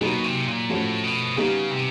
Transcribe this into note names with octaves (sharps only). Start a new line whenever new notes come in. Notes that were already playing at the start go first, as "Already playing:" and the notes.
B2 F#3 A#3 D#4 G#4
C3
A#2
A2 F3 A3 C#4 F#4
B2
C#3 G3 B3 D#4 G#4
C3